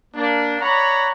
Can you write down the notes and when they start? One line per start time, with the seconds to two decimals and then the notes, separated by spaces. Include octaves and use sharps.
0.15 A#3 D4
0.60 C#5 D5 F#5 A#5 B5